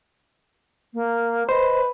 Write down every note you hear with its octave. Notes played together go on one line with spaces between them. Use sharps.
A#3
B4 C5 D#5